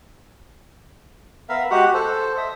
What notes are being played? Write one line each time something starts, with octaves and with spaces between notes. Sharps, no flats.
B3 A#4 E5 F5
G#3 F#4 G4 F#5
A4 C5
D#5 E5